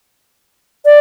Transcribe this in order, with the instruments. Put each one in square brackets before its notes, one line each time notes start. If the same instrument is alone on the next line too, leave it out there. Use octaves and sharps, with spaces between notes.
[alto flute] D5